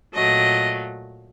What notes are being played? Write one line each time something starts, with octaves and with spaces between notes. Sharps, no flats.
A#2 F#3 A3 D#5